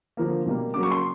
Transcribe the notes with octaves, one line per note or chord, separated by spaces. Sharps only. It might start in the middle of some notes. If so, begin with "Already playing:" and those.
D3 F3 A#3
B2 G3 A#3
C#3 F#3 A#3 D6
C#6
C6